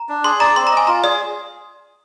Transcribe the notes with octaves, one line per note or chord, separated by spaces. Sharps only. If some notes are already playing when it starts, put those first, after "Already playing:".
Already playing: A#5
D4
G#4 C6
D5 A#5
C4 C6
D#5 A#5
G#5
F4 A#5
G#4 D5